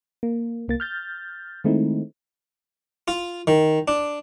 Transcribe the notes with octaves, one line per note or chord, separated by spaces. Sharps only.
A#3
C2 A#3 A6
F6 G6 A6
D#3 G#3 A3 C4 D#4 E4
F4
D#3
D4